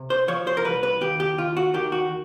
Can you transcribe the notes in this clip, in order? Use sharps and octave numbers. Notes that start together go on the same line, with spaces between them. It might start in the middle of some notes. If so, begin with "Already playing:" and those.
Already playing: C3
C5
F3 C#5
C5
A#4
C2 B4
B4
D#2 G4
G4
D#2 F4
F#4
D#3 G4
F#4